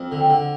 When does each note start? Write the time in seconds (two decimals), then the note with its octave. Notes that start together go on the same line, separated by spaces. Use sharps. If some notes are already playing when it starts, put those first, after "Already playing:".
Already playing: F2
0.12 D3
0.21 G5
0.30 D3